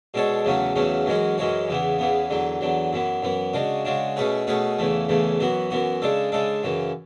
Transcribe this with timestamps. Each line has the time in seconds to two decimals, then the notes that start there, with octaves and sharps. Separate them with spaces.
0.14 B2 G#3 D4 A4 C#5
0.45 E2 C#3 F#3 A3 C#4
0.75 E2 C#3 F#3 A3 C#4
1.06 F#2 E3 G#3 C#4 F#4
1.38 F#2 E3 G#3 C#4 F#4
1.69 E2 C#3 E3 B3
1.99 E2 C#3 E3 B3
2.30 E2 D3 F#3
2.61 E2 D3 F#3
2.93 F#2 E3 B3
3.22 F#2 E3 B3
3.53 C#3 G#3 D4 F#4
3.85 C#3 G#3 D4 F#4
4.16 B2 A3 C#4 G#4 B4
4.47 B2 A3 C#4 G#4 B4
4.78 E2 C#3 E3 A3
5.08 E2 C#3 E3 A3
5.40 F#2 E3 B3 F#4
5.70 F#2 E3 B3 F#4
6.02 C#3 G#3 D4 A4
6.32 C#3 G#3 D4 A4
6.63 F#2 C#3 E3